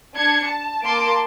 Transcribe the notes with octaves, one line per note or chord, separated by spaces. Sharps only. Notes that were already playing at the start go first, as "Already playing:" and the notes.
D4 G#6 C#7
A5
A#3 A#4 A5 C6 D6 D7